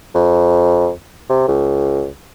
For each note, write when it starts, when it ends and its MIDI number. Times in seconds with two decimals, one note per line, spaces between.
0.14 0.90 41
1.29 1.46 48
1.48 2.09 37